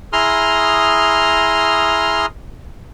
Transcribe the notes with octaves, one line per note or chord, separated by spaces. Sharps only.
E4 G#4 A#5 C6 D#6 F6